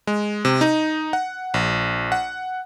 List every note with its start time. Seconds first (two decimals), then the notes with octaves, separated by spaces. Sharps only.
0.07 G#3
0.45 C3
0.61 D#4
1.13 F#5
1.54 A#1
2.12 F#5